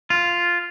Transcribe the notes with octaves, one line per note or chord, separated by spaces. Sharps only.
F4